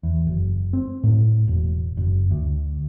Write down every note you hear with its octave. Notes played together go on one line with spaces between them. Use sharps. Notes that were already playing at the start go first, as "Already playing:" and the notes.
E2
F#1
C4
A2
E1
F#1
D2